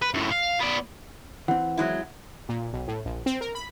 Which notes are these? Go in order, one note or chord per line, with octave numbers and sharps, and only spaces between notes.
B4
F#2 A2
F5
B3 D5
E3 C4 F#5
F#3 G#3 E4
A#2
B1
A2
A#1
C4
A#4
B5